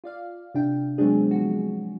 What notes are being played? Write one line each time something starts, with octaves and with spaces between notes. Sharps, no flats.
F4 D5 F5
C3 D4 G5
F#3 G#3 B3 C4 D4 G#4
F3 F#4